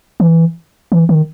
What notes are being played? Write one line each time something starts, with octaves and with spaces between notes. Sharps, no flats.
E3
E3
D#3